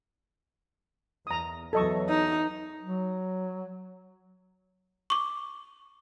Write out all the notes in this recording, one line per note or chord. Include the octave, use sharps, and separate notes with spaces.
E2 A#5 D#6
E2 E3 F#3 A4 D#5 C#6
D#4
F#3
C#6 D6